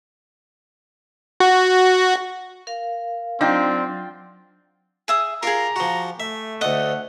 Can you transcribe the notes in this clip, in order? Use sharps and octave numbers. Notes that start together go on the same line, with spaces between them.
F#4
A#4 F5
F#3 C4 D4 D#4 F4 G5
G#4 E5 D#6
F4 G4 G#4 A#4 A#5
F3 F#4
A3 E5
D2 D#5 F#5